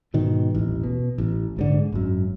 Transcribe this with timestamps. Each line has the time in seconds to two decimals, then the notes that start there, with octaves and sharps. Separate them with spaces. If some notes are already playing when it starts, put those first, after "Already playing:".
0.14 G#2 B2 D#3
0.55 D#1 A1
0.83 B2
1.18 A1
1.57 A#1 G#2 D3
1.92 G#1 F#2